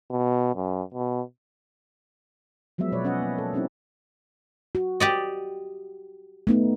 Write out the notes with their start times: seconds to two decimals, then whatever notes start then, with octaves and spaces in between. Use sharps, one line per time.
0.11 B2
0.56 F#2
0.94 B2
2.78 F3 F#3 G#3 B3 E5
2.92 B2 B4 C#5 D5
3.04 C#4 B4 D#5 E5 F#5
3.22 A#3
3.38 A4
3.53 G3 C4 C#4 D#4 E4 G4
4.75 F#4
5.00 G4 D5 D#5
6.47 A3 B3 D#4